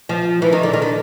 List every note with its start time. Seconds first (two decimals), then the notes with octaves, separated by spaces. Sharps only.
0.09 F3
0.42 E3
0.53 D#3
0.63 D3
0.73 D#3
0.82 D3